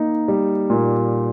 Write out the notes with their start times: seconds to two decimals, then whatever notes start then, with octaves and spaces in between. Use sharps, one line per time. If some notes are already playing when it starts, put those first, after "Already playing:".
Already playing: A#3 D#4
0.28 G3
0.70 A#2